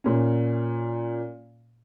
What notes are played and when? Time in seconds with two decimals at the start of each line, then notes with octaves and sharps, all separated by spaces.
0.04 A#2 C#4